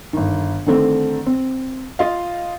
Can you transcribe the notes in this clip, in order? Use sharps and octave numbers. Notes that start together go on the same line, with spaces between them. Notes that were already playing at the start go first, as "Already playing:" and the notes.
G1 D#3
D3 D#3 A3 C4
C4
F4 D#5 F5